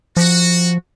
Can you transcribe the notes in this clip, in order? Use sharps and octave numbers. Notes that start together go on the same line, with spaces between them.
F3 F#4